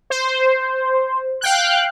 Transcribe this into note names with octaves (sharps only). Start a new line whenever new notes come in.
C5
F5 G5 F#6